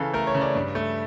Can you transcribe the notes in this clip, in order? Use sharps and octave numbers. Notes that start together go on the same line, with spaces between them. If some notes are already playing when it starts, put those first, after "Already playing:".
Already playing: C#3 E3 A4 F5
A3 A#4
C#5
C#3
D5
G2
A3